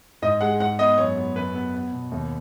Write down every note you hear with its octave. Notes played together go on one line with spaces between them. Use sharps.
G#2 D#5
G#3 F#5
G#2 F#5
B3 D#5
F#2 C#5
B3
F#2 B4
B3
B3
B2
D#2